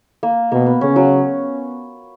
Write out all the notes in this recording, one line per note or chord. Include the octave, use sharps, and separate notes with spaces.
A#3
B2 A#3
B3
C#3 C#4
F#3